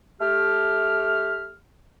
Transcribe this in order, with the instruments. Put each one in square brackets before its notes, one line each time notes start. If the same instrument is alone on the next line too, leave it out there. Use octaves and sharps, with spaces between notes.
[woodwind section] A3 G4 F6